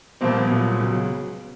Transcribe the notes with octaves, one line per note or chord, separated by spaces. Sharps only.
C2 A#2 F3 A#3 C4
B3
C2 A#2 F#3
C#2 C#3 F#3